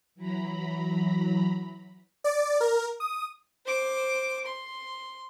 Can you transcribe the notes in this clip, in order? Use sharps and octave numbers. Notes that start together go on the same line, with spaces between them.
E3 F#3 A#5 B5
D5
A#4
D#6
C5 D6
C6